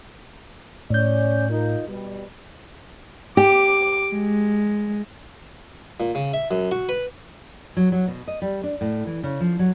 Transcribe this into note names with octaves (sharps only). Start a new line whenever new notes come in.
A2 C#4 C#5 D5 G6
D#4 F4 A#4
B2 G3
G4 D6
G#3
A#2
C#3
E5
F#2
F#4
B4
F#3
F#3
B2
D#5
G3
D4
A2
E3
C#3
F3
F#3